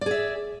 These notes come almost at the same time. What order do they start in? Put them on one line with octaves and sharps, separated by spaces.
D5 G#4 E5